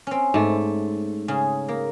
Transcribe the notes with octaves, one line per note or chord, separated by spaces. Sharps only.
C4 C#4
G#2 A3
C#3 G#4 G#5
A#3